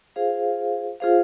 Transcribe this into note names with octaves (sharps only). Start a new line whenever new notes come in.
F4 G#4 C5 F5
F4 G#4 C5 F5